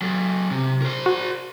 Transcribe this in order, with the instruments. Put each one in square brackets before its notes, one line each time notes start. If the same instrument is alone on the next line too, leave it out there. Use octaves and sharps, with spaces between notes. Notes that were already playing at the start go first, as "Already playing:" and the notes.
[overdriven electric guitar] F#3 A4
C3
A#4 C5
[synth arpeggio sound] F#4